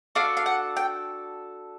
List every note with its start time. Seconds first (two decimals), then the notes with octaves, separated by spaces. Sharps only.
0.15 D4 F#4 A4 F5
0.37 F5
0.46 F#5
0.77 G5